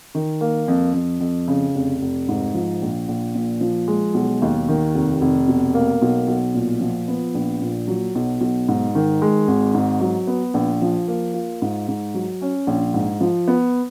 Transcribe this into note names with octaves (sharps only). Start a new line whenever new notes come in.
D#3
A#3
F2
F2
F2
C#3
F1
F1
G#2
F3
A#1
A#1
A#2
F3
G#3
B1
D#2
D#3
F1
F1
B2
A#3
B1
B1
A#2
F3
B3
A#1
A#2
F#3
B1
B1
G#2
D#3
G#3
G#1
G#2
F#3
B3
A#1
F3
A#3
F4
G#2
G#2
F#3
C#4
A#1
G#2
F3
B3